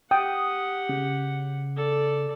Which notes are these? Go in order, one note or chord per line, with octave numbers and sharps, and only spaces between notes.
G4 F#5 G5 D#6
C#3
A4 D5